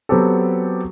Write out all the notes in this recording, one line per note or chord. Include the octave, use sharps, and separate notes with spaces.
F#3 B3 C4 G4 A4